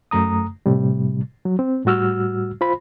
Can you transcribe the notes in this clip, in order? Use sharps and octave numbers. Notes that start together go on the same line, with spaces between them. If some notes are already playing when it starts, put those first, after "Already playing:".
F#2 A3 A#5 D#6
A2 C3 G3
F#3
C4
A2 G3 F#4 E6 F6
F4 C5 B5